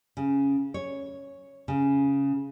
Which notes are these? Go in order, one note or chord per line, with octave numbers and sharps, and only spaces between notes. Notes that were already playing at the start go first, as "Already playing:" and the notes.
C#3
C#5
C#3